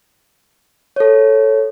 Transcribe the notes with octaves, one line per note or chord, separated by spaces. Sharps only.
A4 C#5